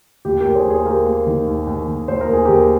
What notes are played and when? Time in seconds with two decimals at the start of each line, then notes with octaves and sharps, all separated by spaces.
0.25 D#2 G4
0.41 D#2 G4 A#4
0.55 G#4 C5
0.66 D#2 G#4 C5
0.86 A#3 G4 A#4
1.07 A#3
1.27 D#3
1.47 D#2
1.67 D#2
1.88 D#2
2.08 D#2 C5
2.21 A#4
2.28 D#2 G#4
2.45 D#2 G4 A#4